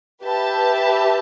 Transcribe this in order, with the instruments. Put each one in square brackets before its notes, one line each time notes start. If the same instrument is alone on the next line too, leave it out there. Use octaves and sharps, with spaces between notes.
[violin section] G4 B4 E5 A5